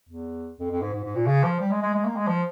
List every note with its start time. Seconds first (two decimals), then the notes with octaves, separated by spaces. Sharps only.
0.09 E2
0.59 F2
0.71 F2
0.82 G#2
0.93 G#2
1.04 G#2
1.16 A#2
1.26 C#3
1.43 F3
1.60 G3
1.71 G#3
1.82 G#3
1.94 G#3
2.05 A#3
2.16 G#3
2.27 F3